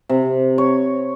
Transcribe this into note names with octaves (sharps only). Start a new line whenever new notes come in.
C3
C#5